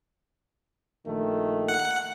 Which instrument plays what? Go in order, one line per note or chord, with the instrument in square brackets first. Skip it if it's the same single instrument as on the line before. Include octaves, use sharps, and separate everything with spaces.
[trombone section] A#1 D#3 A3
[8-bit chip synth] F#5